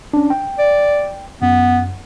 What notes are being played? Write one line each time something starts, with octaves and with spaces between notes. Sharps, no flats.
C#4 D4
G5
D5
F#2 B3